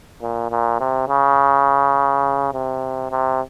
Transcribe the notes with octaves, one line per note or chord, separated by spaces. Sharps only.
A#2
A#2
C3
C#3
C3
C3